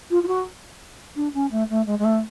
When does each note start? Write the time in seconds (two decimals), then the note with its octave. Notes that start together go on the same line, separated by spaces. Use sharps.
0.10 F4
0.23 F4
0.27 F#4
1.16 D4
1.34 C#4
1.51 A3
1.69 A3
1.86 G#3
1.99 G#3
2.05 A3